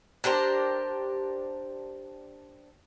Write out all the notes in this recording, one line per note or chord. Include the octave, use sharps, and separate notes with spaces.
D4 G4 A#4 C5